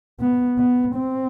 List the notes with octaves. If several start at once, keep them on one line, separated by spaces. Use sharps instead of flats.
B3
B3
C4